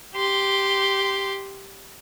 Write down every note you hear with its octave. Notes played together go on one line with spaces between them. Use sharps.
G4 C6